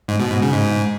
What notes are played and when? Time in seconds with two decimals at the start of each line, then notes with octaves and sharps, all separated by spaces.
0.08 G#2
0.20 B2
0.31 G#2
0.42 C#3
0.53 G#2